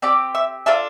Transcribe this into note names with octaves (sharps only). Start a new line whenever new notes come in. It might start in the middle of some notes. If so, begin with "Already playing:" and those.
C4 G4 D5 D6
E5 E6
D4 F4 A4 E5 E6